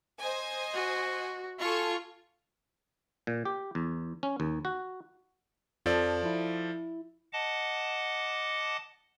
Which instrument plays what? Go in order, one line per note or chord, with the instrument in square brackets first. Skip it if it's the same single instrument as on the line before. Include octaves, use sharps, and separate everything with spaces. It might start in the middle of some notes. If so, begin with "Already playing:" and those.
[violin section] C5 D#5 G#5
[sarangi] F#4
[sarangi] F4 [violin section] A4 G#5 C#6
[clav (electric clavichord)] A#2
G4
E2
C#4
D#2
F#4
[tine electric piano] F2 [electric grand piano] F3 A4 D5
[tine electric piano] E4
[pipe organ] D#5 F#5 A5 D6